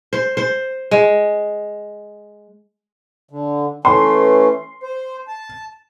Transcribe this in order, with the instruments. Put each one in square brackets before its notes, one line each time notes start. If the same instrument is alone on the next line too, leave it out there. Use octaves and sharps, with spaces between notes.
[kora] C5
C5
G#3
[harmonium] D3
[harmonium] E3 A3 C#4 [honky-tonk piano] C6
[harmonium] C5
A5